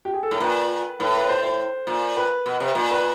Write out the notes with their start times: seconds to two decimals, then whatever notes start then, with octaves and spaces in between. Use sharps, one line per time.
0.05 G4
0.14 G#4
0.23 A4
0.31 A2 A#4
0.40 A#2 B4
0.99 A2 B4
1.17 B4
1.29 C5
1.43 C5
1.87 A#2
2.17 B4
2.46 B2
2.60 C3
2.75 A#2
2.91 B4